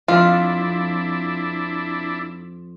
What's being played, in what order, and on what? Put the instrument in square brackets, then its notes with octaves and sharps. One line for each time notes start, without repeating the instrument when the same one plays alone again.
[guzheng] F2 [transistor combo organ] D4 E4 [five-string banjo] F4